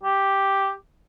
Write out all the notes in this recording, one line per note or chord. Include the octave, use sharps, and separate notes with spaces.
G4